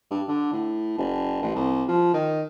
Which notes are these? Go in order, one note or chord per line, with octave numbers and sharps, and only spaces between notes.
G2
D3
A2
F#1
A1
C2
F3
D#3